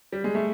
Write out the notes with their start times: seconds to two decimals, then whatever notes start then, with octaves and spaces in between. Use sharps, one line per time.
0.13 G3
0.24 G#3
0.35 A3